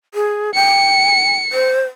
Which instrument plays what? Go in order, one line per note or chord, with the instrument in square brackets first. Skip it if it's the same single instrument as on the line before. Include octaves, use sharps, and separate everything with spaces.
[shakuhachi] G#4
[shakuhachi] G5 [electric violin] C#7
[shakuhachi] C5